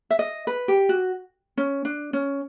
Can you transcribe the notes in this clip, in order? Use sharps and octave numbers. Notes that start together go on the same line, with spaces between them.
E5
D#5
B4
G4
F#4
C#4
D4
C#4